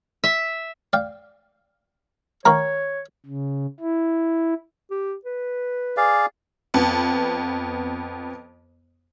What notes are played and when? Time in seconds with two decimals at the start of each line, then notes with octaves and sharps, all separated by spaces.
0.24 E5
0.93 D5 F5 G5
2.45 D#3 C#5 F5 A#5 C#6 D6
3.26 C#3
3.80 E4
4.91 G4
5.25 B4
5.97 G#4 D5 F5
6.74 F2 B3